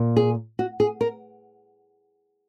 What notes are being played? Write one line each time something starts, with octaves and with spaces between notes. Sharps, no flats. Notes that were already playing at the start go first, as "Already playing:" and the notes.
Already playing: A#2 A#3
G#4
F#4
G#4
A#4